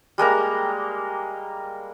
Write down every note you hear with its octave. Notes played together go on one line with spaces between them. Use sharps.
G3 G#3 A#3 A#5